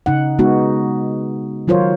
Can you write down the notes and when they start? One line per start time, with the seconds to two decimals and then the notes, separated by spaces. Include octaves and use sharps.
0.06 C#3 D#4 F#5
0.39 G#3 B3 D#4 F#4
1.68 D#3 F#3 F4 A#4 C5 C#5